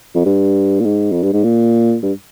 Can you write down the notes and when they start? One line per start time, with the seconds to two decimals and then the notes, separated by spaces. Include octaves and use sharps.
0.15 F2
0.26 G2
0.80 A#2
0.85 G#2
1.12 F2
1.23 G2
1.33 G#2
1.44 A#2
2.03 G2